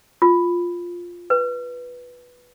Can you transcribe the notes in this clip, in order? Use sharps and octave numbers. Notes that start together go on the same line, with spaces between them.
F4
B4